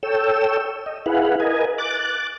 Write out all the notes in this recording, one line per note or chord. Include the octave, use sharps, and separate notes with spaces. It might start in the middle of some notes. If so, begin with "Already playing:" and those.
A4 C#5 G5 E6
D#5
E4 G#4 B4 F5 F#5
A#4 B4 D#5 G#5
D6 F#6 A6